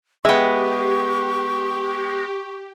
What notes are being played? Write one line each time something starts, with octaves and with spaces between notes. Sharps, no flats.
G#3 B3 G4 E5 G5 C#6